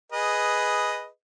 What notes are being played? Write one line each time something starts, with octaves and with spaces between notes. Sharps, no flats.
G#4 B4 D#5